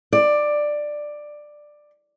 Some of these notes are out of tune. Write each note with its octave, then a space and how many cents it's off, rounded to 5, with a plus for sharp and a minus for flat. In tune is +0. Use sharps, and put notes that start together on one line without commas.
D5 +10